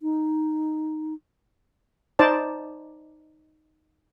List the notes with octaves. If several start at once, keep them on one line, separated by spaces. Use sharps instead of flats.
D#4
D#4 C5 D5 A5